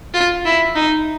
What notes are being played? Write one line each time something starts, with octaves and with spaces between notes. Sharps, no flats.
F4
E4
D#4